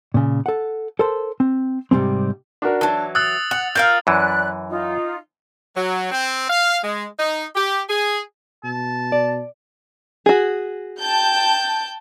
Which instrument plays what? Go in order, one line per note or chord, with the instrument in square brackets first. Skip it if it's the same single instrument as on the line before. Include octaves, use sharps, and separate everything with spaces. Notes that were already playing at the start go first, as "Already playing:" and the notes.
[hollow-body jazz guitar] A#2 C#3
A4 F#5
A4 A#4 C5 A5
C4
G#2 C3 G3 G#3 C4
[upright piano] D4 F#4 A#4
[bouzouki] E3 F#3 [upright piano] D4 A5
[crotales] D#6 E6 A6 [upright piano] F#6
[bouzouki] F#5 [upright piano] F#6
[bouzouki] F4 A#4 F5 [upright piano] G6
[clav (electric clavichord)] F#2 E3 [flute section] D5 B5 F#6
[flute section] D#4 F4
[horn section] F#3
C4
F5
G#3
D#4
G4
G#4
[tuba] B2 [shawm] A5
[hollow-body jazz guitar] D5
[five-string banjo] F#4 G#4
[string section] G5 A5 G6